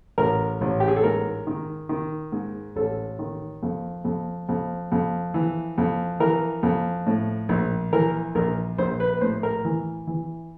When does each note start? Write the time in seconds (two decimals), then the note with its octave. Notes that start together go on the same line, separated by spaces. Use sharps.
0.18 A1 A#4
0.61 A1
0.80 G4
0.88 G#4
0.96 A4
1.03 G#2 A#4
1.47 D#3
1.89 D#3
2.32 G#2
2.76 A1 A4
3.19 D#3
3.63 F2
4.05 F2
4.49 F2
4.92 F2
5.34 E3
5.78 F2
6.20 E3 A#4
6.63 F2
7.06 A2
7.49 A#1
7.93 E3 A#4
8.35 A#1 A#4
8.78 A#1 C5
9.00 B4
9.14 B4
9.21 A2 C5
9.43 A#4
9.65 E3
10.07 E3